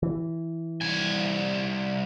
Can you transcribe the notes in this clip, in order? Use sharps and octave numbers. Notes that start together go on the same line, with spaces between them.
E3
C2 G#5